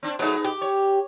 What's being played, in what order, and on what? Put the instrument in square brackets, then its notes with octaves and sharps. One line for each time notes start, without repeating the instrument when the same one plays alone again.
[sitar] C4 D4
[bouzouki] F#3 A3 [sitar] B3 D#4 G#4
[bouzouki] G4
[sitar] C#5